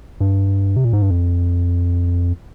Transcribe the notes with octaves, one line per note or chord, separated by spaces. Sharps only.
G2
C3
A#2
G#2
G2
F2